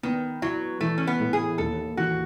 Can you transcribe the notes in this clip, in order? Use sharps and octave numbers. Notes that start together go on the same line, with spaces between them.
D#3 B3
F#3 E4
E3 A3
C#4
B3
A2
G#4
D#2 A4
E3 F#4